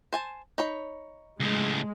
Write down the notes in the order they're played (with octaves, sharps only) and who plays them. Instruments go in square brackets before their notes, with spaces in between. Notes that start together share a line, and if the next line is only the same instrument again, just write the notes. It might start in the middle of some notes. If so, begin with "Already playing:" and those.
[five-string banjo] C5 G#5 A5
D#4 C#5 B5
[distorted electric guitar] C#2 A2 [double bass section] G#3